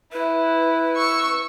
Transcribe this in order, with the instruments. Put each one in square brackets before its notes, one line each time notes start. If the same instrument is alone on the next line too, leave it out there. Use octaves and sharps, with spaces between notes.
[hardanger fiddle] E4 [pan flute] B4
[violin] C#6 E6